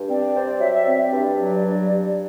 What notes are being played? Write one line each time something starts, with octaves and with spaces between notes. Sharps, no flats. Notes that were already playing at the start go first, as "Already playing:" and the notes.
Already playing: G2
C4 D5
C4
F#3 E5
E5
C4 E5
D5
G2
F#3
G2
G2